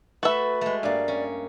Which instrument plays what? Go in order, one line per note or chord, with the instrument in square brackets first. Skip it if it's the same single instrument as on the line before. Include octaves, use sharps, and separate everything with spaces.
[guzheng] A3 A4 [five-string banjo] F#4 E5 [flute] B4
[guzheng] G#3 A3
[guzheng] G2 A#3 [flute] D5
[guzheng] C#4